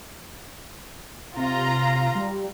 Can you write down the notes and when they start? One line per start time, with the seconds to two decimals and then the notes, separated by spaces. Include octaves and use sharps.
1.37 C3 F4 A#5
2.15 G3